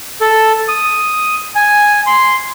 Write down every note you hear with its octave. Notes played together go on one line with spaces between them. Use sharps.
A4
D#6
G#5
C6